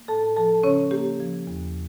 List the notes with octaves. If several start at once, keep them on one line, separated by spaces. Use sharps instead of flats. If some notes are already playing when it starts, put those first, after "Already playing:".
Already playing: A#3
A2 A4 A5
F3 A4 A5
C#3 C#4 C#5
A#3 G4
F3
E2